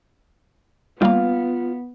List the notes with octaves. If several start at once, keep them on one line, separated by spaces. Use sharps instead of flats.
G3 A#3 B3 F4 F5